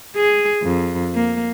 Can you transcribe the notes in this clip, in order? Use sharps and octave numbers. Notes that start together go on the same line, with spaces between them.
G#4
F2
A#3